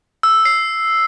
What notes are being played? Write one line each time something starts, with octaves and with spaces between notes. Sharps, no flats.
E6
C7